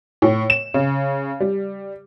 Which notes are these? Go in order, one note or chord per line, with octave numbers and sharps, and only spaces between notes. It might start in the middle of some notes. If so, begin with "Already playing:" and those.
A2
E7
C#3
G3